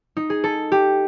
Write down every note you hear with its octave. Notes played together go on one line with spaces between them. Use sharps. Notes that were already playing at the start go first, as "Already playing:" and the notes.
D#4
G#4
A4
G4